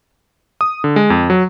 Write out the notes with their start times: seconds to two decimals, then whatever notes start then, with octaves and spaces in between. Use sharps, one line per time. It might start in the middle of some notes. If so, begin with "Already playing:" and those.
0.61 D#6
0.84 D3
0.96 G#3
1.10 F2
1.30 F#3